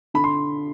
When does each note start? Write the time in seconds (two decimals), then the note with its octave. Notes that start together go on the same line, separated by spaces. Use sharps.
0.14 D3 B5
0.24 C6